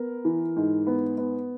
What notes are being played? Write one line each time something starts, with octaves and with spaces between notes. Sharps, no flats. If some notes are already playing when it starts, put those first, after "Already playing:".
Already playing: B3 A#4
E3
G#2
B3
B3